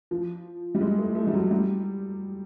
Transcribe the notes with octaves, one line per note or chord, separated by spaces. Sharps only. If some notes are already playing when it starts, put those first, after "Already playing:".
F3
G3
G#3
A3
A3
G3
F#3
G3